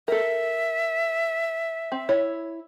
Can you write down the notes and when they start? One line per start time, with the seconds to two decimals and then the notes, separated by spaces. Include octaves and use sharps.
0.08 A4 A#4 E5
1.92 C4
2.09 E4 C#5